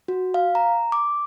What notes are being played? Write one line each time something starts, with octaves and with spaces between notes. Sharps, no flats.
F#4
F5
A#5
D6